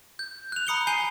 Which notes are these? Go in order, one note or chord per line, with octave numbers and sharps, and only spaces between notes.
G6
F#6 F7
A#5 B5 D#6 C#7 F7 G7
G#5 G6 C7 D#7 G7